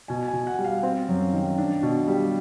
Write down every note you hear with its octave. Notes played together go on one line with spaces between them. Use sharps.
B2 G#5
G#5
B2
F#5
G3
F5
C4
F#2
D#3
D4
B2
G3